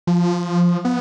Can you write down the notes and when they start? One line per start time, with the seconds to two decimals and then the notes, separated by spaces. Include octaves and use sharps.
0.07 F3
0.85 B3